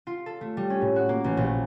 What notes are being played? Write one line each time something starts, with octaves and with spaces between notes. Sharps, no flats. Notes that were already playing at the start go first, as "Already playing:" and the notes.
F4
A4
A3
G3
C#4
A2
F#4
A#3
A1
A#1